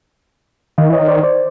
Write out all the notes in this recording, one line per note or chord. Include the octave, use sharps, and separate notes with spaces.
D#3 D#5 F5
E3 C#5 D#5
D#3
C5 D5
C5 D5